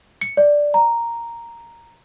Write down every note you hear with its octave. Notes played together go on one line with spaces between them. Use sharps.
C#7
D5
A#5